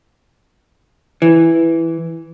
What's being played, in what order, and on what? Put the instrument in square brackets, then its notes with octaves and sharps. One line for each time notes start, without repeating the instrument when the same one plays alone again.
[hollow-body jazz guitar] E3